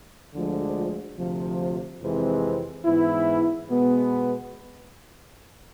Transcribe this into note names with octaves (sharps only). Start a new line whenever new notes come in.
D2 D3 F3 G#3
D2 C3 F3
F2 C3 E3 G#3 C4
G#2 E3 B3 E4
B2 G#3 B3